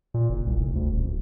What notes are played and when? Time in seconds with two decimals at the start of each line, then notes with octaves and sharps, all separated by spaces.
0.14 A#2
0.29 F#1
0.47 C2
0.58 F1
0.75 D2
0.91 D#1
1.06 D1